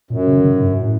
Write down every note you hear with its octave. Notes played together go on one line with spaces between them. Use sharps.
F#2 A#2
C#3
D3
C#3
G#2
G2
A2